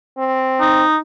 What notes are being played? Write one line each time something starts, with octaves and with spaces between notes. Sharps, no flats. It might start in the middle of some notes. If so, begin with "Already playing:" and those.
C4
D#4